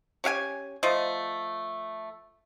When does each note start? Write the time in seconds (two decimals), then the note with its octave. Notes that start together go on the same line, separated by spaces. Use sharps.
0.24 C#4 G4 F5 G#5
0.83 F3 A3 D#5